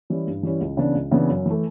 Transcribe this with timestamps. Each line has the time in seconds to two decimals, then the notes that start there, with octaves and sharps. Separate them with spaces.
0.10 E3 G3 C#4 E4
0.27 G2
0.43 E3 G3 C#4 E4
0.61 C#2
0.77 C#3 E3 B3 D4
0.95 C#2
1.11 C#3 E3 B3 D4
1.29 F#2
1.46 E3 A3